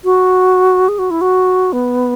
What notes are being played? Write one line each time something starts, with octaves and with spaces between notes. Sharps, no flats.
F#4
G#4
F#4
E4
F#4
B3